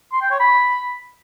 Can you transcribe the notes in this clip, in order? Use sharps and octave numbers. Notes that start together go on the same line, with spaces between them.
C6
G5
C#5
B5